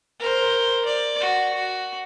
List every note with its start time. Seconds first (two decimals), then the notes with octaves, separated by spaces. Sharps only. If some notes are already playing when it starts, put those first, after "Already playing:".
0.20 A#4 C5
0.85 D5
1.21 F#4
1.54 F#4